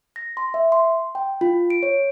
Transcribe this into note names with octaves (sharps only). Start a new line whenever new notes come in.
A#6
C6
E5
C6
G5
F4
D7
C#5